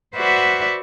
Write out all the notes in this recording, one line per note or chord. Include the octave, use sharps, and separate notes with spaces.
F#4 B4 C5 D5 E5 F#5